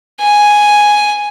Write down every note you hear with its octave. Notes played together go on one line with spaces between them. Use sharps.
G#5